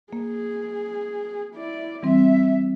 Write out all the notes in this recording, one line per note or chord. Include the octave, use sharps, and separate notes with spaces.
A#3 G#4
E4 D5
E3 G3 C4 E5